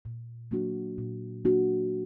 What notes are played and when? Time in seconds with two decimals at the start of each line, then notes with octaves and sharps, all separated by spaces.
0.05 A#2
0.51 F#3 A#3 D4 F#4
0.98 A#2
1.45 F#3 A#3 D4 F#4